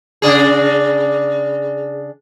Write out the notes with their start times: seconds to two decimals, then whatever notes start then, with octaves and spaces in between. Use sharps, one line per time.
0.22 C#3 D4 G#4